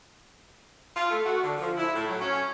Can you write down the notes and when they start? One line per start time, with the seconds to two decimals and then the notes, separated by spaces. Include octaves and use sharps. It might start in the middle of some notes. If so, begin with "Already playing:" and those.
0.96 F4
1.10 A3
1.25 F#4
1.42 D3
1.57 F3
1.77 E4
1.94 A2
2.07 F#3
2.21 C#4